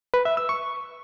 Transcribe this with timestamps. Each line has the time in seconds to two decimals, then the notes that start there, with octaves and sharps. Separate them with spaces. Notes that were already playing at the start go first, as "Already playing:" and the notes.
0.14 B4
0.25 E5
0.37 E6
0.49 C#6